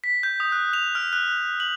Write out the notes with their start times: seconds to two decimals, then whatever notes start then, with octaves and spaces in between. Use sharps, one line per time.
0.04 B6
0.23 G6
0.40 D#6
0.52 F#6
0.73 F7
0.95 F6
1.13 F#6
1.60 F#7